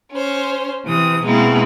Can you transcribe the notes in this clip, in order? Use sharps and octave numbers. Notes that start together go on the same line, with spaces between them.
C#4 C5
C3 E3 D#6
B2 G#3 A#3 C4 D#4 E4